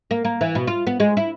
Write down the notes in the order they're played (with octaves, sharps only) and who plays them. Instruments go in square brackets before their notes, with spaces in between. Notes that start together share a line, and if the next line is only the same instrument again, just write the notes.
[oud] A#3
A#3
E3
B2
F4
B3
G#3
E4